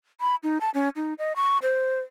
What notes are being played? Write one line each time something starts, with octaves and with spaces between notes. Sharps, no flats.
B5
D#4
A5
C#4
D#4
D#5
C#6
C5